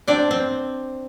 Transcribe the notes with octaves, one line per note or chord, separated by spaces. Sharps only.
C4 D4 D5
C4